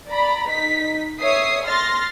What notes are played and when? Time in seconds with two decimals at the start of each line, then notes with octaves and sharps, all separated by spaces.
0.10 D5 A#5 B5
0.49 D#4 B6
1.19 C#5 E5 D#6 C7
1.65 C6 F6 A6 A#6